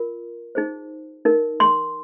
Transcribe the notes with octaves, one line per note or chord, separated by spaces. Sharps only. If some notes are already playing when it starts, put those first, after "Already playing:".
Already playing: F4 A#4
D#4 G#4 C5
D#4 A#4
C6